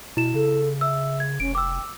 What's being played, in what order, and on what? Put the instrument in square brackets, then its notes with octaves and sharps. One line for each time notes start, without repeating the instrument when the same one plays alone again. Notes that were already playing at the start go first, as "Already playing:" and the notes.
[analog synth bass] B2 [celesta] E4 E7
[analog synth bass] C#3 [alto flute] A4
[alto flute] E5 [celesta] E6
[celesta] G#6
[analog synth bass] F1 [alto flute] C#4 [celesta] D7
[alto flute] G5 [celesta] D6 E6